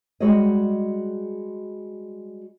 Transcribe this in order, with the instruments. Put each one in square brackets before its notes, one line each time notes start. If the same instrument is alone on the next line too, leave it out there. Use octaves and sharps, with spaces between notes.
[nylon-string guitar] G3 G#3 F#4 G#4 C#5 D#5